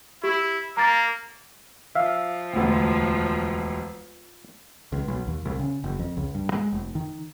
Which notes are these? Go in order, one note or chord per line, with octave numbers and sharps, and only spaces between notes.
E4 G4
A#3 A#5 A6
F3 E5 F5
E1 D2
C#2
B1
D#2
C2
C#3
F#1
F2
C#2
G2
G#3
F1
D#3